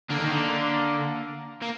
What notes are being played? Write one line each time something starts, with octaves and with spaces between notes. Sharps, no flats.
D3 A#3
D#3
D3
A#3